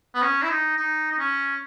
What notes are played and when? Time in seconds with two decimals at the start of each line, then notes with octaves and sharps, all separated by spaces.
0.15 B3
0.22 C#4
0.42 E4
0.50 D#4
0.77 D#4
1.11 D#4
1.18 C#4